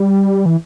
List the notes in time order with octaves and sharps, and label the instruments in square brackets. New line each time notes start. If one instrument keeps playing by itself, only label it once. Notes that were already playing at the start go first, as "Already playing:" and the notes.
Already playing: [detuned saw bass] G3
E3